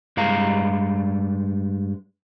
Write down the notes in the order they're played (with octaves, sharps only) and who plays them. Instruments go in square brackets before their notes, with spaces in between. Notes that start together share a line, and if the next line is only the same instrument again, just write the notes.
[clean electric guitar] G2 G#3 F5 A#5